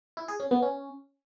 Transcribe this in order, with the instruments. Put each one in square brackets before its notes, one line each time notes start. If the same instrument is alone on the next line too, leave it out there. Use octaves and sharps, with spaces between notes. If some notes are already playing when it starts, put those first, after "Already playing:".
[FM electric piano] E4
G#4
C#4
B3
C#4